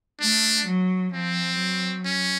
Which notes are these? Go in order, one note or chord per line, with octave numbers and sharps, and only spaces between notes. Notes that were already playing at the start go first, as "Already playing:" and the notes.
A3 D4
F#3
F3 C4
F#3
C#4